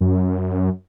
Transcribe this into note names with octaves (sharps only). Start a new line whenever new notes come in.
F#2